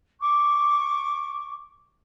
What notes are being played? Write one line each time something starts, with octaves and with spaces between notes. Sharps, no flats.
C#6 D6